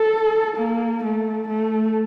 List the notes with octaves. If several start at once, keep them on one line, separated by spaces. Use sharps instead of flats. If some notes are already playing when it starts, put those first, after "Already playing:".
Already playing: A4
A#3
A3
A3